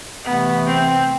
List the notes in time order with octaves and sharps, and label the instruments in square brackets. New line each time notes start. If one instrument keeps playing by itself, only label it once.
[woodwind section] C3 E3 A3 [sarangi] B3
[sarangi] C4